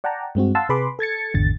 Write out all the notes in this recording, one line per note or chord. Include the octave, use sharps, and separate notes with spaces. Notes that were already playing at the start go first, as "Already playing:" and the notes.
D5 F#5 G5 A5 A#5
G2 G#3 C4 F#4
F5 F#5 A5 C6 E6
C3 G#4 B4 B5 C6 D6
A4 G#6 A6 C#7
G#1 E2 D3 A6